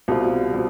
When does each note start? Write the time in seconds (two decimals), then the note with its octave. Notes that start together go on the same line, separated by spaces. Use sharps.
0.08 C2 B2 G3 C4 F4
0.53 B2 G3 C4 F4